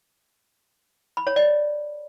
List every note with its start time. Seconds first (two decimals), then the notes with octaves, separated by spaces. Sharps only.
1.17 B5
1.27 C#5
1.36 D5